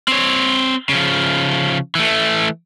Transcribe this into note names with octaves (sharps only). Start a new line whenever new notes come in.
C4 C#5
C#3 F3
E3 A3